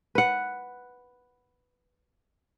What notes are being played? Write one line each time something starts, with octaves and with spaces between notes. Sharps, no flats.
B4 F#5